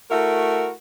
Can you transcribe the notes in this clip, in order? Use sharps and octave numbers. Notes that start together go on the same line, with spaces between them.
A3 E4 F#4 A#4